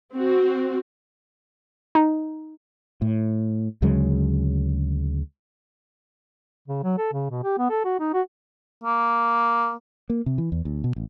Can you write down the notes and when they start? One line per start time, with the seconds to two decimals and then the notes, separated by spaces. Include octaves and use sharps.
0.14 C4 F#4
1.95 D#4
3.02 A2
3.82 D2 C#3 F#3 G#3
6.68 C#3
6.83 F#3
6.98 A4
7.12 C#3
7.30 B2
7.43 G4
7.58 B3
7.70 A4
7.84 F#4
8.00 D#4
8.13 F#4
8.84 A#3
10.10 A#3
10.26 C3
10.38 E3
10.52 E2
10.65 D2
10.84 B2
10.96 A1